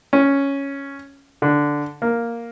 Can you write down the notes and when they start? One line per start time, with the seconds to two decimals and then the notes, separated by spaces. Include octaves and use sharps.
0.13 C#4
1.42 D3
2.02 A#3